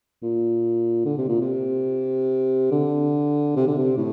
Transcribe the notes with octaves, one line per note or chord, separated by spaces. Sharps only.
A#2
D3
C3
A#2
C3
D3
C3
D3
C3
A2